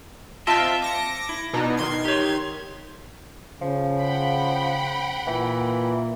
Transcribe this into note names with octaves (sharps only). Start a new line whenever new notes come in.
C4 F4 D#5 E5 G5 A5
D6 A#6 C#7
E4
B2 D4 D#4
D#3 C6 G#6
G4 C#5
C#3 F3
F#5 G5 B5
A#2 E3